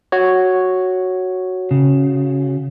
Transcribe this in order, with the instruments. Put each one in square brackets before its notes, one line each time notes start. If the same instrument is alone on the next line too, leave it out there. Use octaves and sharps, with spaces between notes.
[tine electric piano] F#4 C#5
[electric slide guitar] C#3